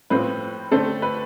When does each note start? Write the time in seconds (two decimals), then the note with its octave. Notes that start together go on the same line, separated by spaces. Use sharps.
0.10 A2 F3 C4 B4
0.71 D3 A3 C4 A4
1.02 B4